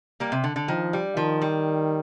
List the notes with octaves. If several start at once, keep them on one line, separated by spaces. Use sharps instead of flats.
G3 A#3
C3
D3
D3
D#3 F3
G3
D#3 F3
G3